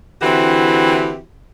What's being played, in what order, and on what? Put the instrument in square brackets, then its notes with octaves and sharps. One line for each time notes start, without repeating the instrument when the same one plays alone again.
[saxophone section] D3 E3 C4 E4 F#4 G4